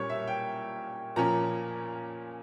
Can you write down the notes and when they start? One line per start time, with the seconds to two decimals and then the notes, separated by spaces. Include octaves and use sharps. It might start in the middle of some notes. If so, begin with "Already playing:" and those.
Already playing: A#2 G3 C#4 A#4 C#5
0.09 E5
0.28 G5
1.16 A#2 F3 A#3 C#4 A#5